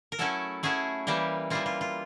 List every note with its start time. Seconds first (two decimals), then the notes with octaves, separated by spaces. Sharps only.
0.12 A#4
0.19 F#3 A3 C#4 E4 A4
0.63 F#3 A3 C#4 E4 G#4
1.07 E3 G3 A#3 G4
1.50 E3 G3 A#3 F4
1.66 F4
1.81 F4